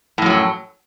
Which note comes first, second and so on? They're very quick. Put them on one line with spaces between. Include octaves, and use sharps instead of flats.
A2 F#2 F#3